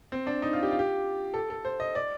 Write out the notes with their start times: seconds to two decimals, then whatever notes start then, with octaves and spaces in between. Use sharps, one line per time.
0.12 C4
0.27 D4
0.42 D#4
0.53 F4
0.63 G4
0.71 F4
0.79 G4
1.34 A4
1.50 A4
1.65 C5
1.80 D#5
1.95 D5